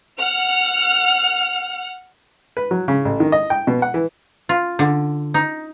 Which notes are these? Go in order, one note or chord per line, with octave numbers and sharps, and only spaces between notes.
F#5 F6
B4
F#3
C#3
A1
D#3
D#5
G5
B2
F#5
E3
F4
D3
D#4